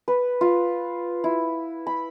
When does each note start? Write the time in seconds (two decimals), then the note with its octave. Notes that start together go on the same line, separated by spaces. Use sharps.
0.08 B4
0.41 F4
1.24 E4
1.87 B5